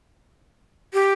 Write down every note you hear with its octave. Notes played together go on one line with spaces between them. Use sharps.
G4